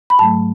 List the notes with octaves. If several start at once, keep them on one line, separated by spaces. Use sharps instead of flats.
B5
G#2 F#3 A3 A5